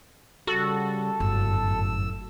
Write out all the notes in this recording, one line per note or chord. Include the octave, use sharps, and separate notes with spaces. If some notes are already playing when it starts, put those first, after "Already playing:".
C#3 G3 F#4 A4
G1 F#2 A2 E6